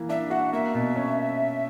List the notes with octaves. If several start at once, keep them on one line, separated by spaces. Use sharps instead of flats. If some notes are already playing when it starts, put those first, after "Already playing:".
Already playing: E3 A#3
D4 E5
F#4 F#5
A#3 E5
B2
C#4